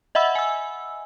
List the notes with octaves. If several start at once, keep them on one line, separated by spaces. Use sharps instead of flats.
D#5 E5 F#5 B5 E6
G#5 E6